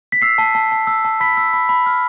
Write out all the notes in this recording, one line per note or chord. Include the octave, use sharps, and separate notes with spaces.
B6
E6 C7
A5
A5
A5
E6
A5
B5 B6
E6
B5
B5
F6